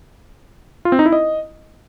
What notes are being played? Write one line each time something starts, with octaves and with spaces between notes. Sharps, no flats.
F4
C4
D#4
E4
D#5